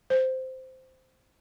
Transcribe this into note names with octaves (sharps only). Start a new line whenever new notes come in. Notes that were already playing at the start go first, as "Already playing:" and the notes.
C5